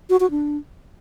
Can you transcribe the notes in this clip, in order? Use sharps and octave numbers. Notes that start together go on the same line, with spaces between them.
F#4
F#4
D4